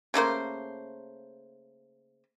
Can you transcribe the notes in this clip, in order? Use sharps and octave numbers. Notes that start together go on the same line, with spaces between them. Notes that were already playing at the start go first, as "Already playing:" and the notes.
C#3 A3 A#3 C5